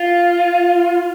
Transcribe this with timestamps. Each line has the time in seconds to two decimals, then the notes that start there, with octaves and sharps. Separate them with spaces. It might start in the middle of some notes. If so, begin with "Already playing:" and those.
Already playing: F4